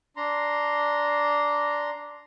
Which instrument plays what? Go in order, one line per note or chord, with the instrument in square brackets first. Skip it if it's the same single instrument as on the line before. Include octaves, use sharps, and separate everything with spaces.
[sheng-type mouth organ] D4 A#5 C6